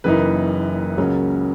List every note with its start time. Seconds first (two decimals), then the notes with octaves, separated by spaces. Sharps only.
0.04 F#1 F#2 E3 A#3 D#4 B4
0.98 C#2 C#3 F#3 A#3 C#4